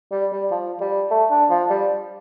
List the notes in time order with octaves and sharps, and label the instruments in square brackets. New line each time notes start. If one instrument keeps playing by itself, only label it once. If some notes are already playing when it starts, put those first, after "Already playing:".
[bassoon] G3
G3
F3
G3
A3
D4
F3
G3